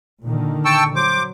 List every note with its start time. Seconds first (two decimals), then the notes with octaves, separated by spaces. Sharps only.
0.24 A#2 D3 D#3
0.65 G5 A5 C#6 E6
0.96 F#3 C5 D6